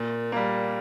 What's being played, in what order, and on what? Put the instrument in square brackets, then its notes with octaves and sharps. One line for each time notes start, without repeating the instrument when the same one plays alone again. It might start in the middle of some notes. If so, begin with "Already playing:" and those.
Already playing: [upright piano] A#2
G3 A#3